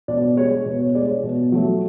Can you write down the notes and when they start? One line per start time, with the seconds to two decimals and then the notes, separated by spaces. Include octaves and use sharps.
0.08 B2 D5
0.37 G#3 C#5
0.66 B2
0.80 C#5
0.95 G#3 D5
1.08 C#5
1.23 B2
1.52 F#3 A3